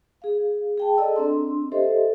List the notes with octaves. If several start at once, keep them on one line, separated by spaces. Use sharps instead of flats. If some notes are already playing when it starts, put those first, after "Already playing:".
G#4 F5
G#4 G5 A5
A4 D5 D#5 A#5 E6
C4 D4 C6
G4 A4 C5 D#5 E5